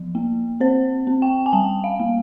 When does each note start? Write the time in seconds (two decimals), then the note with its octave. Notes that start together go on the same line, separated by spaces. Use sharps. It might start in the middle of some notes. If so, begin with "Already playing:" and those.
Already playing: F3
0.15 A#3
0.60 C4 C5
1.07 C4
1.22 G5
1.46 G#5
1.53 G3 A5
1.84 F5
2.00 A#3